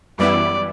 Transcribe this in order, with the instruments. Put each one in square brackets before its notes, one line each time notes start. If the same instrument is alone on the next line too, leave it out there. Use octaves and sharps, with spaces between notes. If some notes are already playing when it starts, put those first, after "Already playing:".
[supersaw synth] F#2 E3 G3 B3 E4 [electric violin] D5